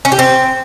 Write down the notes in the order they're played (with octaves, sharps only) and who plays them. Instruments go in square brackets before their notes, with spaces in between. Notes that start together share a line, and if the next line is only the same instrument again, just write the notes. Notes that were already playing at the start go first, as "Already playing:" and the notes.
[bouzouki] C#4
G4
C4